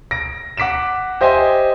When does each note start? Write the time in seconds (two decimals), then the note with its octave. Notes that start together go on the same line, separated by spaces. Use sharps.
0.11 A#6 D7
0.57 F#5 D6 B6 D7 E7
1.21 G4 C5 D#5 E5 G#5